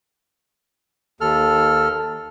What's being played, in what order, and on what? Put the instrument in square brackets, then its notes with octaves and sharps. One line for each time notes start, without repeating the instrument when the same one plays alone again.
[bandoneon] D#2 A4 F6